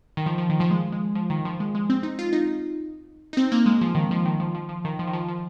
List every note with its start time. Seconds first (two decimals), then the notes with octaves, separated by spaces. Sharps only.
0.17 D#3
0.26 F3
0.38 F3
0.49 D#3
0.60 F3
0.71 G#3
0.93 G#3
1.15 F3
1.30 D#3
1.45 F3
1.60 G#3
1.75 G#3
1.90 C4
2.03 D#4
2.19 F4
2.33 D#4
3.33 D#4
3.37 C4
3.52 A#3
3.66 G#3
3.81 F3
3.95 D#3
4.11 F3
4.25 D#3
4.40 F3
4.55 F3
4.69 F3
4.85 D#3
4.99 F3
5.07 D#3
5.13 F3
5.28 F3